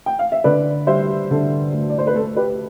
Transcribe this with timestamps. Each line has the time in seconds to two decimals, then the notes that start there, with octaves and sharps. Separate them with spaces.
0.06 G5
0.19 F5
0.32 E5
0.44 D3 B4 D5
0.87 G3 C5 E5
1.31 D3 A4
1.73 D2
1.90 D5
1.98 C5
2.07 B4
2.15 A3 A4
2.37 G4 B4